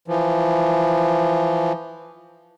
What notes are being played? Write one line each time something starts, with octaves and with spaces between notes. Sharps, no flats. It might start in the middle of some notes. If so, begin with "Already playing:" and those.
E3 F3